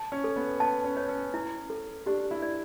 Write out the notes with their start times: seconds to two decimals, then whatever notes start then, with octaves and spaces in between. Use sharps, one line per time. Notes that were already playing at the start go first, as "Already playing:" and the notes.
Already playing: A5
0.12 C#4
0.24 A4
0.36 B3
0.60 B3 A5
0.84 C#4
0.97 C#5
1.09 C#4
1.34 E4
1.70 A4
2.06 D4 G4
2.31 E4
2.43 D5